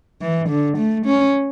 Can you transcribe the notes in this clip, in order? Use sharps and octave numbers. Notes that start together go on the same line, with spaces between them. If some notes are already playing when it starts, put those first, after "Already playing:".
E3
D3
A3
C#4